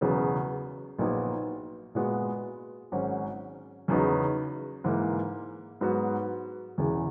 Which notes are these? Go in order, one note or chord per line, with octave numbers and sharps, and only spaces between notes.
E1 E2 C#3 F#3 B3
A#1 A#2 F#3 B3 D#4
A#2 G#3 B3 F#4
G#1 G#2 F#3 C#4 F#4
E2 C#3 F#3 B3 D#4
G#2 E3 A#3
G#2 F#3 B3 F#4
E1 E2 C#3 E3